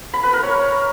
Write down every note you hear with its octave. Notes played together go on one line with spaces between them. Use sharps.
B5
B4
A#4
C#5